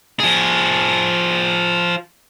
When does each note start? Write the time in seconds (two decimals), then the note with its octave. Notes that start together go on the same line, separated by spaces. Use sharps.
0.20 F3 G#4